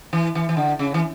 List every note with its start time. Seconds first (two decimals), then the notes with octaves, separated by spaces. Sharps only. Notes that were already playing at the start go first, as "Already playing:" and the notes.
0.13 E3
0.35 E3
0.49 E3
0.57 D3
0.79 C#3
0.94 E3